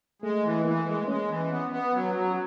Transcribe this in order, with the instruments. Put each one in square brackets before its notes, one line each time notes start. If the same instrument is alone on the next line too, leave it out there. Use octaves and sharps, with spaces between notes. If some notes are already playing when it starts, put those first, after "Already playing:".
[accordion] G#3 [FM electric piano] A3
[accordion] E3
[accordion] E3 [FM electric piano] A#3
[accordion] G#3
[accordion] G#3 [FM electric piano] C#4
[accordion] E3
B3
B3
F#3
F#3